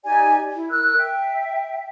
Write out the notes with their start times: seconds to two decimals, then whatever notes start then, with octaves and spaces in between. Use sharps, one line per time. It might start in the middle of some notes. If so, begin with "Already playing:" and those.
0.05 D#4 G4 D5 G#5
0.54 E4
0.70 A#4 E6 F#6
0.96 E5 G5